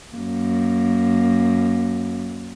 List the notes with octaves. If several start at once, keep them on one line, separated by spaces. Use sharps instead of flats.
F#2 A#3